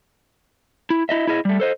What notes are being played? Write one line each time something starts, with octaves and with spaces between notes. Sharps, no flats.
E4
E4 D#5 E5
E4 G#4 D#5
G3 A3
A4 C5 D#5